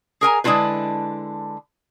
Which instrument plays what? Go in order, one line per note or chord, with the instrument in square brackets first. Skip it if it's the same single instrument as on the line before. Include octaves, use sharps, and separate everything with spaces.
[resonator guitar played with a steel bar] G#4 A#4 G#5 A#5
D3 G#3 D4 E4 F4 B4